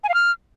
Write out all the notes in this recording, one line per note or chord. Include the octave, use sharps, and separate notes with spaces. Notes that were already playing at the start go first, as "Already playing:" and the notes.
G#5
F5
F6